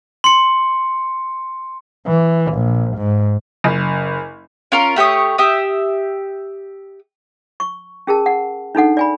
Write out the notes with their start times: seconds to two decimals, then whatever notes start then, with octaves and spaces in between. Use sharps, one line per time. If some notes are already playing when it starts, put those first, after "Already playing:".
0.24 C6 C#7
2.07 E3
2.53 A#1
2.97 G#2
3.64 F#1
4.72 C#4 F4 A#4
4.96 A3 G4 C#5 D#6
5.38 G4 E5 D#6
7.60 C#6
8.07 C#4 G#4 A#4 A5
8.26 F#5
8.75 D4 D#4 A4 F#5
8.97 D5 G#5 B5